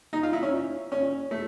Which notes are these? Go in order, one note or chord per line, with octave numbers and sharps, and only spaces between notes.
D#4
F4
E4
C#4
C#4
A3